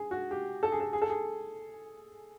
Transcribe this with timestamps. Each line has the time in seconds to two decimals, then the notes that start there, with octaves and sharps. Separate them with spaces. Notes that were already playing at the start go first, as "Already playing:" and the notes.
Already playing: G#4
0.11 F#4
0.31 G4
0.63 A4
0.72 G#4
0.80 A4
0.93 G#4
1.02 A4
1.10 G#4